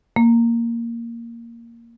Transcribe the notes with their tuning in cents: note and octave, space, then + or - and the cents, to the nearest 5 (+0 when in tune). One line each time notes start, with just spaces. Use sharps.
A#3 -5